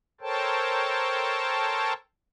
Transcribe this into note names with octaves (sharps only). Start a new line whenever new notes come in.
A4 A#4 C5 C#5 G5 A5